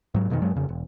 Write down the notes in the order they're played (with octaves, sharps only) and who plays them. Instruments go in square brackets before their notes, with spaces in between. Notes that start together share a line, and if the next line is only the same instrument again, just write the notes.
[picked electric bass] G#2 F#3
F2 B2 D3 D#3
G2 F#3 G#3
F2 C#3
E1